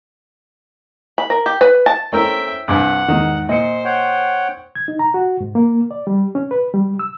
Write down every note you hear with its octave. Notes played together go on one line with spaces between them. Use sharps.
B5
A#4
G4
B4
A5
A3 C#4 E4 A#4 C5 E5 G5
C2 G2 F#5 G#5 D6
E2 G#2 D#3
A#2 C5 D#5 C#7
C#5 F#5 G5
G#6
D#4
A#5
F#4
G#2
A#3
D5
G3
C#4
B4
G3
E6